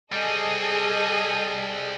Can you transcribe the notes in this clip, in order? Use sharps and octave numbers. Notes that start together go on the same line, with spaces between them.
G3 C4 G#4 A4 D#5